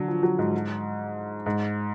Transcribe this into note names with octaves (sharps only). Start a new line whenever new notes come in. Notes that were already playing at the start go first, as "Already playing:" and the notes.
Already playing: D3 F#3
F3
F#3
G#2
G#2